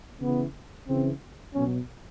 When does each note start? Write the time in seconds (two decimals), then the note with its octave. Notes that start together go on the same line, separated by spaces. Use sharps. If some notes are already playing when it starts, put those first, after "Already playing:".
0.22 C#3 E3 B3
0.88 C#3 E3 C4
1.54 B2 F#3 C#4